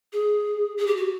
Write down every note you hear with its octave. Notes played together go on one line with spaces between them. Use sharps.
G#4
G#4
G4
F#4